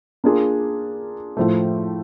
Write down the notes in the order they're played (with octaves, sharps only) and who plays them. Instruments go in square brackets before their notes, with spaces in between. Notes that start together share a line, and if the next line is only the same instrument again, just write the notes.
[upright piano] A#3 D4 F4 G#4
A2 F3 A3